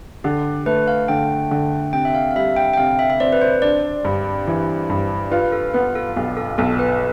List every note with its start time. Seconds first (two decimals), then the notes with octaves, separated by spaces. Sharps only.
0.24 D3 G4
0.66 A3 B4
0.88 F5
1.08 D3 G5
1.51 D3
1.93 C3 G5
2.05 E5
2.15 F5
2.31 F5
2.36 G3 E5
2.57 G5
2.73 G5
2.77 C3 F5
2.99 E5
3.10 E5
3.20 C4 D5
3.32 B4
3.41 C5
3.62 D4 D5
4.05 G2
4.47 E3
4.90 G2
5.32 F4 B4
5.52 A4
5.74 B3 B4
5.95 A4
6.16 B1 G4
6.37 A4
6.58 B1 A4
6.79 B4